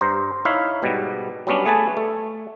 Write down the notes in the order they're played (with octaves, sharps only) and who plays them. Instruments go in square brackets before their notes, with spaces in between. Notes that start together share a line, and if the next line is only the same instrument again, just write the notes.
[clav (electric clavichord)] G2 C5 A#5
D#4 E4 C#5 E5 F5
G#2 B2 G3
F#3 G3 B3 C#4 D4
A3 G#4 B4 G#5 A5
A3